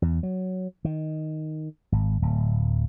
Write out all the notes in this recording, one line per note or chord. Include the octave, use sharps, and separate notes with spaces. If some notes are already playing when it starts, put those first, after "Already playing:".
E2
F#3
D#3
G#1
D1